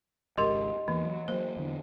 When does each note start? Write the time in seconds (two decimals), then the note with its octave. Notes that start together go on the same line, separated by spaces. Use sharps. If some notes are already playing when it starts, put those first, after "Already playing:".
0.37 G#1 C#2 G#2 G4 A#4 D#5 C6
0.88 E2 E3 A#3
1.05 F#3
1.28 F#3 A#3 C5
1.56 E2 D3 E3